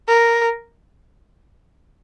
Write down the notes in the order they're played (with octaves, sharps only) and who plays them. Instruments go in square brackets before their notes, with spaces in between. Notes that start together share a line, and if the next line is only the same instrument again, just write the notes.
[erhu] A#4